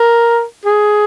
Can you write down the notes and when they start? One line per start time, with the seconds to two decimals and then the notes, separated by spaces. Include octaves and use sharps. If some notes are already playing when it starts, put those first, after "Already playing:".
Already playing: A#4
0.65 G#4